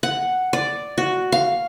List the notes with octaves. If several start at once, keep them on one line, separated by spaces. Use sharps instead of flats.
F#5
D5
F#4
F5